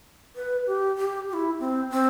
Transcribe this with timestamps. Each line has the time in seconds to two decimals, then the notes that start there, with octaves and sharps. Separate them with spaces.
0.36 B4
0.67 G4
0.98 G4
1.29 G4
1.34 E4
1.60 C4
1.91 C4